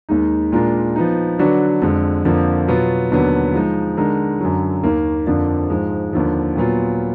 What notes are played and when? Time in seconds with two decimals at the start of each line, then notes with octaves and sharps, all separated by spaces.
0.09 D#2 D#3 G#3 D#4
0.52 A#2 G#3 D4 F4 A#4
0.96 F3 B3 D#4
1.39 D3 F#3 D4 F#4 B4
1.82 F2 D3 G#3
2.25 F2 D3 F3 A#3
2.68 B2 F#3 B3 F4
3.12 D#2 D3 F#3 B3
3.54 F3 G#3 D#4
3.97 D3 G#3 D#4 A#4
4.41 F#2 D3 F#3
4.84 D#2 D#3 A#3
5.27 F2 D3 F3 A#3 D4
5.70 G#2 F3 G#3
6.13 D#2 D3 F3
6.56 A#2 F#3 B3 F4